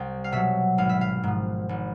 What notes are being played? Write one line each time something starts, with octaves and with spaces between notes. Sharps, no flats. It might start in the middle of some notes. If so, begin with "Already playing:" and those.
Already playing: C2 G5
F5
B2 F#3 E5
G#1 F5
E5
F5
G#2 F3
G#1